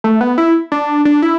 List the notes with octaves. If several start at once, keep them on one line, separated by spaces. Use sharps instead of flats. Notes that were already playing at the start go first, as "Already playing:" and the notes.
A3
B3
E4
D4
D4
E4